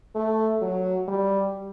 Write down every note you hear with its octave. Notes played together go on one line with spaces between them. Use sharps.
A3
F#3
G3